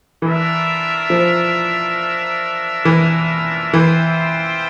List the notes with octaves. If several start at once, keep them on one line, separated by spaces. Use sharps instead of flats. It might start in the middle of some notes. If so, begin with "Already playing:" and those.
E3 D4 F4 A#4 E5
F3
E3
E3 F4 C5 E5 G5